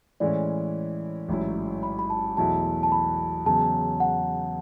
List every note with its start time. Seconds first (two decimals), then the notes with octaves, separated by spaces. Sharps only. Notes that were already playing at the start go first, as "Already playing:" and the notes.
0.20 A2 E3 G#3 C#4 E4 D5
1.28 A1 G#2 F#3 C#4 E4
1.83 B5
1.99 B5
2.10 A5
2.37 E2 B2 F#3 A3 E4 A5
2.83 A5
2.92 B5
3.46 E2 C#3 F#3 B3 A5
4.00 F#5